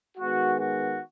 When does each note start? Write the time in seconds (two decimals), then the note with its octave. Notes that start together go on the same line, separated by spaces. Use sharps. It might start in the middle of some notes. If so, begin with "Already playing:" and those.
0.18 D#3 G#3 B3 F#4
0.59 F#4